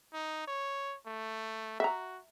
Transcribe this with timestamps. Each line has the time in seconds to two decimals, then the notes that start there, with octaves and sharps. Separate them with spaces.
0.13 D#4
0.47 C#5
1.06 A3
1.80 F#4 E5 A#5